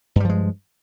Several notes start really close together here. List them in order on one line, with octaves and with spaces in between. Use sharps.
G2 G3 F3 G#3